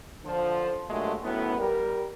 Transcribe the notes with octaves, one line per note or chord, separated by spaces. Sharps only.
D3 F3
G2 A#2 F#3 G#3 A3
F#2 A2 B3
G3 A#4